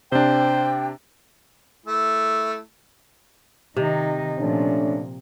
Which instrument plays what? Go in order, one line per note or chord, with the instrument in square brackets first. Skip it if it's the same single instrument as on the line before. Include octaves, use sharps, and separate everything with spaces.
[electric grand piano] C3 D4 [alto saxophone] C5 [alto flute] G5
[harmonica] A3 E4
[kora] C3 [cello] D#3 D#4
[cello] A#2 F3 [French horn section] A3 C#4 D4